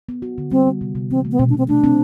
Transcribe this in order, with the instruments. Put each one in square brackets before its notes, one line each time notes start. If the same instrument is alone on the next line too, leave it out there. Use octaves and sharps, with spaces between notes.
[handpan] B3
F#4
D3
[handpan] G3 [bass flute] C4
[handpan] B3
C3
C3
[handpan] E3 [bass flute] C4
[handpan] A3
[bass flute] B3
[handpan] B2 [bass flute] C4
[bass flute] D4
[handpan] B2 [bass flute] C4
[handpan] A3 [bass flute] D4
[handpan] C4